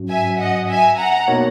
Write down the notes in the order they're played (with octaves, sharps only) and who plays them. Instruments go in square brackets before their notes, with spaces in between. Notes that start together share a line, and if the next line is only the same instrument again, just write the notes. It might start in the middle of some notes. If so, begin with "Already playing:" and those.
Already playing: [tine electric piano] G#2 F#3 C#4 F#4
[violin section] E5 G#5
D#5 F#5
E5 G#5
F#5 A#5
[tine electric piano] B2 A#3 D#4 A#4 C#5